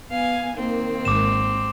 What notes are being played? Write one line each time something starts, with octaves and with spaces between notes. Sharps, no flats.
B3 F5 G#5
D#3 A#3 C4
G#1 D6 E7